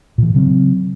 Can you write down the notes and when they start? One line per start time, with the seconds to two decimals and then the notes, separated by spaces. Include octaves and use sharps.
0.18 A#2 E3
0.34 C#3 F#3 C4